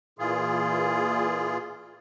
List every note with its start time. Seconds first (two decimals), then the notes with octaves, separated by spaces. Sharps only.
0.19 A#2 E3 F4 G#4